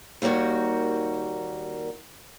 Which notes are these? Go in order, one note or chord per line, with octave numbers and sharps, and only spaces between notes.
D#2 D#3 G3 A#3 F#4